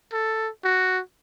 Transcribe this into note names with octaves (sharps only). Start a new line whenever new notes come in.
A4
F#4